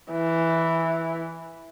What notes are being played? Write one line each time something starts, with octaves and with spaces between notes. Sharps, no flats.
E3